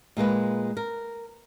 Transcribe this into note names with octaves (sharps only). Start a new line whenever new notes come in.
A#2 G#3 A#3 B4
A#4